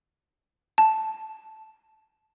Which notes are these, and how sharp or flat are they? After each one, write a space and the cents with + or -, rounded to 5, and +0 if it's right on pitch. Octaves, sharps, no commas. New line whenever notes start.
A5 -5